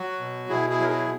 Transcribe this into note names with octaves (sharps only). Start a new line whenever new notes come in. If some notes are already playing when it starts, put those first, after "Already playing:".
Already playing: F#3 F#4
B2
B2 E4 G#4
E4 G#4
F#3 A#4
E4 G#4